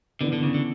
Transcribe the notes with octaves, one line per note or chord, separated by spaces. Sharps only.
D3 E3 B3 D4
D3
C#3
D3